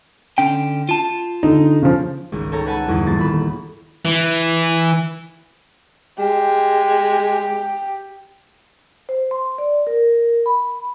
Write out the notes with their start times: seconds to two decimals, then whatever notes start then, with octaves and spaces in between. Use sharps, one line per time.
0.38 D3 C#4 G5
0.89 F4 A5
1.43 D3 D#4
1.82 C#3 F3
2.32 G#1 C#2
2.52 A4 C#5 G5 A#5
2.66 B4 C#5 F#5 G#5 A5 B5
2.87 G1 E2 G#2
3.05 D#1 F3 A#3 A6
3.18 D#1 D#3 B5 E7
4.05 E3
6.19 G#3 G4
9.09 C5
9.31 C6
9.58 D5
9.87 A#4
10.46 B5